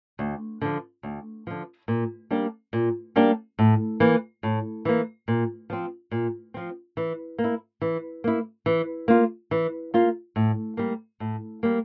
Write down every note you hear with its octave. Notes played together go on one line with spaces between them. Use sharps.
D2
D3 F3
D2
D3 F3
A#2
G3 A#3 D4 G4
A#2
G3 A#3 D4 G4
A2
E3 A#3
A2
E3 A#3
A#2
F3 C4
A#2
F3 C4
E3
A#3
E4
E3
A#3 E4
E3
A#3 F4
E3
A#3 F4
A2
G3 A#3
A2
G3 A#3